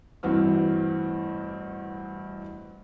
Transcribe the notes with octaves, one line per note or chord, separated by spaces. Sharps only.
A1 G2 E3 C4 F#4 F6